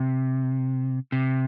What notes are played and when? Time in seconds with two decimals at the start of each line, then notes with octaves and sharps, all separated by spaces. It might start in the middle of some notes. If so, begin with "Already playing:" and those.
Already playing: C3
1.12 C3